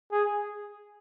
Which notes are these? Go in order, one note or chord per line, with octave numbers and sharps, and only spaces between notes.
G#4